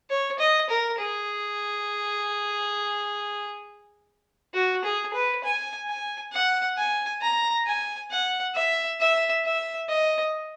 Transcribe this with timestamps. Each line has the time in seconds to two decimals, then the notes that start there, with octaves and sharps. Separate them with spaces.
0.10 C#5
0.39 D#5
0.69 A#4
0.98 G#4
4.54 F#4
4.84 G#4
5.13 B4
5.44 G#5
5.88 G#5
6.33 F#5
6.77 G#5
7.21 A#5
7.66 G#5
8.11 F#5
8.55 E5
9.00 E5
9.45 E5
9.89 D#5